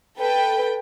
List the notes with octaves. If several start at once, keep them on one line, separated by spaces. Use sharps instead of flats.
A4 B4 G5